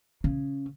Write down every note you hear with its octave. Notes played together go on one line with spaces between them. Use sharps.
C#3